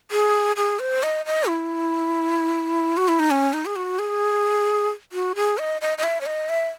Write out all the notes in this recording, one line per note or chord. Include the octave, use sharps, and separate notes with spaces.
G#4
G#4
C5
D#5
D#5
E4
F#4
E4
D#4
C#4
D#4
G#4
F#4
G#4
F#4
G#4
D#5
D#5
D#5
E5
C#5
D#5
E5